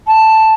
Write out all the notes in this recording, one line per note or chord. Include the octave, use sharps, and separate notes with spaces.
A5